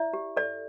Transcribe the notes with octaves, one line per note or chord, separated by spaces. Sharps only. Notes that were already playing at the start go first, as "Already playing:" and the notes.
Already playing: E4 D5 E5
G4
A4 D5